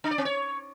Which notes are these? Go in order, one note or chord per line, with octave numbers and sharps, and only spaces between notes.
D4
D5
C4
C#5